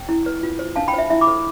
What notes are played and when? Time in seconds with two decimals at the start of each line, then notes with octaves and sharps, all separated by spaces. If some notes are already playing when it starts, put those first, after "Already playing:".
Already playing: G5
0.09 E4
0.26 B4
0.43 F4
0.59 C5
0.76 D4 F5 A5
0.88 G5 B5
0.94 F4 C5 E5
1.10 E4 E5
1.21 B5 D6
1.27 A4 C5